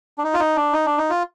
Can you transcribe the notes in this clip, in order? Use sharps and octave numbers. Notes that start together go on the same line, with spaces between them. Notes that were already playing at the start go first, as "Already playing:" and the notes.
D4
D#4
F4
D#4
D4
D#4
D4
D#4
F4